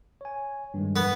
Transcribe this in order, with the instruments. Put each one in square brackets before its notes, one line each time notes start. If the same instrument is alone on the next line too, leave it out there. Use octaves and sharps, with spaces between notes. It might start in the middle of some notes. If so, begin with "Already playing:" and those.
[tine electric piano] C#5 G#5
G2 D#3 G#3
[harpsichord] B3